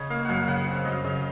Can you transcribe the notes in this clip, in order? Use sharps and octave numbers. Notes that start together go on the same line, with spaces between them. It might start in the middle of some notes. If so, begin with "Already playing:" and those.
Already playing: C#3 C#5 D#5
A#3 F5
F#2 F5 F#5
F5
C#3 F#5
C4
F5
F#2 D#5
F5
C#3 D#5